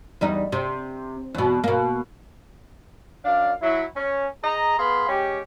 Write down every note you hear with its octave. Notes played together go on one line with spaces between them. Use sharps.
E2 G3 D#4
C3
E2 B2
B2 A#3
F#2 D4 D5 F5
F#3 E4
C#4
G#4 D#5 A#5
B3 G#4 F5 B5 C6
G#3 C#4 G4